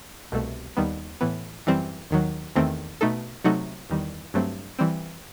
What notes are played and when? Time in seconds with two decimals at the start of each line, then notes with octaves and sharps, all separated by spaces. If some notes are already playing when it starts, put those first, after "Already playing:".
0.32 C2 B2 A3
0.77 D#2 D#3 G3 B3
1.21 A2 E3 B3
1.66 F#2 E3 G3 C4
2.11 D#2 D#3 F#3
2.56 E2 D#3 A3 C4
3.01 B2 A3 D#4 A4
3.44 C3 F#3 A3 D#4 F#4
3.90 E2 D#3 G3
4.34 G2 F#3 A3 C4
4.79 E3 G3 C4